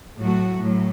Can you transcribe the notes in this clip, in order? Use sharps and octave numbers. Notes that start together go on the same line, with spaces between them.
A2 F#3 A3 F#4
A2 F#3